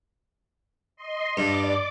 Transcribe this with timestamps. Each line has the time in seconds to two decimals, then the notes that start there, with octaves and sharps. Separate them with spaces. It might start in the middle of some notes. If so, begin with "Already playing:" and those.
0.96 D#5 C6
1.37 G2 D5 D6